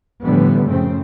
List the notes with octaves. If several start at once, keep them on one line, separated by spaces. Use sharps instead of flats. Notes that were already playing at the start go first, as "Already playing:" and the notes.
A2 D3 E3 F3 G3 B3
F#2 A2 C#3 A3 C4